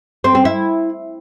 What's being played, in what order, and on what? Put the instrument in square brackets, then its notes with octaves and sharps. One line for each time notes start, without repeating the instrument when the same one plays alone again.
[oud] C4
C4
E4